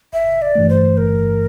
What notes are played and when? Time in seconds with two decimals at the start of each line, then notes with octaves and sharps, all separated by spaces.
0.13 G1 E5
0.42 D5
0.55 G2 E3 A3
0.69 C5
0.97 G1 A#4